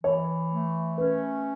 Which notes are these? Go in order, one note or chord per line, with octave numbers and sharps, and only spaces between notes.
E3 C#5
A3
C#4 B4